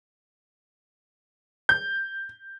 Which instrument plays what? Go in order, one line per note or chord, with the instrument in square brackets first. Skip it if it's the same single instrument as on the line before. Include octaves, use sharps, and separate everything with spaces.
[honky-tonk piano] G6